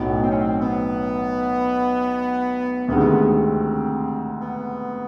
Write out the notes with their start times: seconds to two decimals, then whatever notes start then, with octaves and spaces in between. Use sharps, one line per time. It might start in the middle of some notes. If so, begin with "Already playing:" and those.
Already playing: B1 A2 F#3 B3
0.22 C4
0.31 C#4
0.38 C4
0.61 B3
2.88 D2 C3 D#3 G#3 B3
3.26 C4
4.40 B3